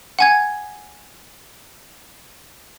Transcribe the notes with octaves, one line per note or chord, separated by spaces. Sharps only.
F#5 G#5 G#6